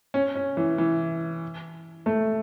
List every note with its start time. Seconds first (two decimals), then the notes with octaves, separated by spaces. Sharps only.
0.14 C#4
0.35 C#4
0.57 E3
0.78 E3
2.06 A3